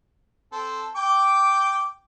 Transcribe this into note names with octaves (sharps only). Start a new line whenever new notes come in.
C4 A4
G5 D6